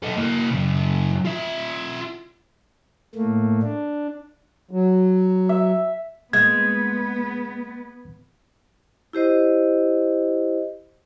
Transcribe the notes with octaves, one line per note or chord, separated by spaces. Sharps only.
D#4 A4
A#3 E4
F#2 C#3
F4 E5
A2 A3 A#3
D4
F#3
E5
G#3 A#3 B3 G#6
E4 G4 C5 D#5